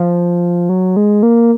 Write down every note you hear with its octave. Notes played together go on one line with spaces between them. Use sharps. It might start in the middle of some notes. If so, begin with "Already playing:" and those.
Already playing: F3
F#3
G#3
A#3